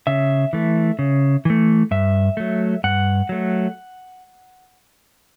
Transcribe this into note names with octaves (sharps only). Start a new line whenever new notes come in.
C#3 E5
E3 A3
C#3
E3 A3
G2 E5
F#3 A3
G2 F#5
F#3 A3